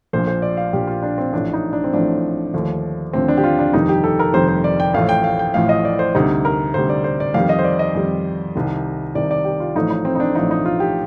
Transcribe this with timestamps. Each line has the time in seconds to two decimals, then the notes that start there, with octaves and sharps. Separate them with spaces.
0.13 A#1 A#2 F3 C5
0.27 C5
0.42 D5
0.57 F5
0.73 A#1 A#2 F3 G4
0.87 F4
1.03 D4
1.18 C4
1.33 A1 A2 F3 D4
1.53 D#4
1.73 D4
1.84 C4
1.93 A1 A2 F3 D4
2.53 D#2 D3 F3 A3
3.13 D#2 D3 F3 A3 C4
3.28 D4
3.37 G4
3.44 F4
3.59 D4
3.73 F1 F2 D#3 G3 D#4
3.89 G4
4.04 A4
4.19 A#4
4.33 F1 F2 D#3 G3 C5
4.48 C5
4.64 D5
4.80 G5
4.93 A1 A2 F3 A3 F5
5.09 G5
5.24 F5
5.39 G5
5.54 A1 A2 F3 A3 F5
5.69 D#5
5.85 D5
5.99 C5
6.15 D2 C3 G3 D#4
6.45 A#4
6.74 D2 C3 G3 C5
6.89 D5
7.04 C5
7.20 D5
7.34 F2 D#3 G3 F5
7.49 D#5
7.59 C5
7.64 D5
7.79 D#5
7.95 F2 D#3 G3
8.56 C2 C3 D#3
9.15 C2 C3 D#3 D5
9.31 D5
9.45 G4
9.60 F4
9.75 A1 A2 F3 A3 D#4
9.90 D#4
10.05 C4
10.15 D#4
10.20 D4
10.35 A1 A2 F3 A3 D#4
10.51 D#4
10.65 F4
10.80 G4